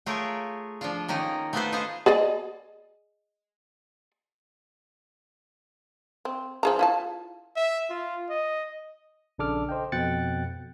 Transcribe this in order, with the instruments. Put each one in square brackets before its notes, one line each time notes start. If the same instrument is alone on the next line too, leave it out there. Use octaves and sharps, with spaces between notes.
[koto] A3 F4 G#4 A#4 C#5 G5
F3 D4 F4
D#3 A#3 C#4 D#4
A3 B3 F4 A4 B4 C5
F4 G#4 C5 D#5 F5
[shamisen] G#4 D5 D#5
C4
F3 G#4 A#5
E4 F4 A5
[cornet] E5
F4
D#5
[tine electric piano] A#1 C#3 D4 A4 D6 F6
A4 C5 D#5 G5
F2 B2 G5 F#6 A6 C#7